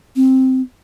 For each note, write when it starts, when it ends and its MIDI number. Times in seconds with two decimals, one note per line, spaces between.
0.16 0.61 60